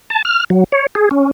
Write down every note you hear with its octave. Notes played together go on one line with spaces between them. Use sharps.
A5
F6
F#3
C#5
G#4
C#4